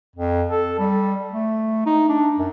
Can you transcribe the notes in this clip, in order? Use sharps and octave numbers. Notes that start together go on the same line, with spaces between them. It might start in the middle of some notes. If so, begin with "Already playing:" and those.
F2
A4
G3
A3
D#4
D4
F#2